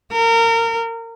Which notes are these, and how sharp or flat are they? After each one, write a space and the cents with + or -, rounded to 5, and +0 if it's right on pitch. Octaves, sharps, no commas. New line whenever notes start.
A#4 -25